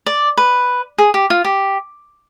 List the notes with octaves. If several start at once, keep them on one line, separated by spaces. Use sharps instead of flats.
D5
B4
G#4
G4
F4
G4